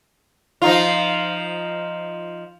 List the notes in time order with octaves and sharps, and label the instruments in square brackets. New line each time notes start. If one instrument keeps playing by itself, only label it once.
[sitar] F3 D#4 F4